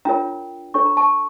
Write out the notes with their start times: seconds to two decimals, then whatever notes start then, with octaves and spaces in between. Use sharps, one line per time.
0.05 D4 F4 A#4 C#5 G5 A#5
0.74 D4 A4 C#5 C#6
0.86 A#5
0.97 A5 C#6